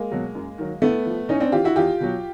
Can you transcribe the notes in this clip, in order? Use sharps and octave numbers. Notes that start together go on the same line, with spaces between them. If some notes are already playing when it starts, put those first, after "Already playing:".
Already playing: G#3 A#3
B2 F#3
F#2
D#3 F#3
A2 A3 B3
F3
A2 C#4 D#4
C4 D4
E3 F4 G4
E4 F#4
E2 F4 G4
B2 F#3